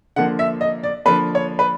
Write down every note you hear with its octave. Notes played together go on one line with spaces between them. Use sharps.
D3 F3 A#3 F#5
E5
D#5
D5
D3 F3 A#3 B4
C#5
B4